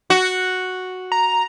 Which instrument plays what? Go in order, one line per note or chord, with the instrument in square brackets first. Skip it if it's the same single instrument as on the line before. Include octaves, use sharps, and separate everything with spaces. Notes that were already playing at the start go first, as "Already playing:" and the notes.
[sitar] F#4
[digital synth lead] A#5